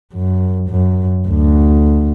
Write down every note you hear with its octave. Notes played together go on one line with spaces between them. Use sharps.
F#2
F#2
D2